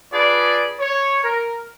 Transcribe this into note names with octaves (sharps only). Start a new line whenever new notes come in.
D4 F4 G#4 B4 D5
C#5
A#4